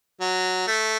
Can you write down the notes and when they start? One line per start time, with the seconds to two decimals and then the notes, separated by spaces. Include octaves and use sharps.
0.21 F#3
0.67 A3